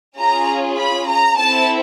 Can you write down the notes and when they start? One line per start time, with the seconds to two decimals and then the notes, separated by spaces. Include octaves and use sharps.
0.18 C#4 F4 G#4 A#5
0.77 B5
1.06 A#5
1.35 C4 E4 A4 A5